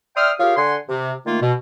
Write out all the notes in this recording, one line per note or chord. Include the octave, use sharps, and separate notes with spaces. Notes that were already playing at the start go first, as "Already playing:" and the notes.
D5 E5 G5 C6 D#6 F6
F4 G4 G#4 A#4 C#5 F5
D3 F#5 G#5 C6
C3
D#3 A3 A#3 F4
B2